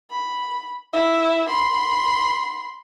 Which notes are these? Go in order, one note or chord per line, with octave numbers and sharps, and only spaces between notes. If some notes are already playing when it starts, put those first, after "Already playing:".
B5
E4 E5
B5 C6